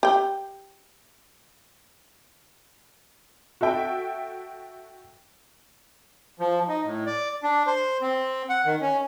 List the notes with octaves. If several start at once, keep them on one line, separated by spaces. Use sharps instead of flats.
G4 G5
F#4 A4 E5 G5
F3
D#4
A2
D5
D4
C5
C4
F#5
D#3
C#4